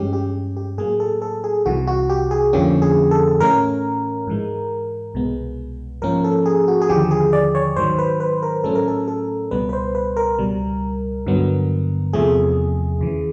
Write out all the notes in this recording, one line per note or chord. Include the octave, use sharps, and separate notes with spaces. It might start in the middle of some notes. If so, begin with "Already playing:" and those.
Already playing: G2 E3 G#3 C#4 G4
G4
G4
A2 F#3 A#3 G#4
A4
A4
G#4
C2 C3 E3 F#4
F#4
G4
G#4
F2 D3 F3 A#3 C#4 G4
G#4
A4
A2 E3 A3 C#4 A#4
G#2 E3 G#3
C2 B2 G#3 B3
G#2 F3 A#3 C#4 A#4
A4
G#4
F#4
G#4
D#2 D3 F3 G4
G#4
D5
C#5
G#2 D#3 F#3 C5
B4
B4
A#4
A2 F#3 A3 C#4 A4
A#4
A4
A4
C#2 B2 G3 B3 B4
B4
C5
B4
A#4
C#2 B2 G3
G2 D3 F#3 B3
E2 C3 F3 A3 G#4
D#2 C#3 E3